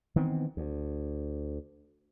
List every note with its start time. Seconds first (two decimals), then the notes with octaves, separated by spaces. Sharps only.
0.16 D#3 E3 B3 C4
0.57 D2